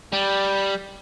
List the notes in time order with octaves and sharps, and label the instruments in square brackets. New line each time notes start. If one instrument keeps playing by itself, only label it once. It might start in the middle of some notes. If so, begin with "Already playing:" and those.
[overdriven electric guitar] G3